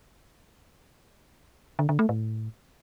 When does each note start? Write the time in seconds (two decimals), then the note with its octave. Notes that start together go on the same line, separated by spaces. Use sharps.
1.79 D3
1.89 D3
1.99 A3
2.09 A2